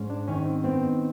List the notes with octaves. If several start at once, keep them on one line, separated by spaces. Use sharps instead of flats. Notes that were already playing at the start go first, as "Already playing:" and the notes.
Already playing: G#2 C#4
D4
D#3 C#4
C4
B3 C4